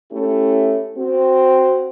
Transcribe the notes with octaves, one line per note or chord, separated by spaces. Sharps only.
A3 C#4 E4 G4
C4 F#4